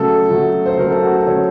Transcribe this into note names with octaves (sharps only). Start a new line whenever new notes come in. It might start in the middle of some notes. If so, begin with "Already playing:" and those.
Already playing: C#3 F#3 A3 A4
C#3 F#3 A3
C5
C#3 F#3 A3 A#4
A4
F#4
A4
C#3 F#3 A3 C#5